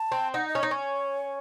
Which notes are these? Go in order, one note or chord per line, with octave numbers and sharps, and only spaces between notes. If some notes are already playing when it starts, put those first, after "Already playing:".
Already playing: A5
C4
D#4 F#5
D#5
C#4
D#4 C#5
C#4